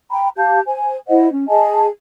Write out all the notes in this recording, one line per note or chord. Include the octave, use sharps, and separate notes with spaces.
G5 A#5 B5
G4 F5 A5 G6
C5 G#5
E4 C5 D#5 F#5
C#4
G#4 D#5 G#5 A5